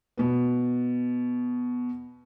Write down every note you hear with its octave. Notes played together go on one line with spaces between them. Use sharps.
B2 B3